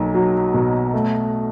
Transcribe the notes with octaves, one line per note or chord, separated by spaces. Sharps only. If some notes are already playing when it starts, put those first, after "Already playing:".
Already playing: B1 A#3
F#3
B2
A3